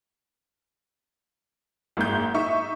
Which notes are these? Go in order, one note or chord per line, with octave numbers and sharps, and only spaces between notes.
F#1 G#2 G6
D#4 E5 C#6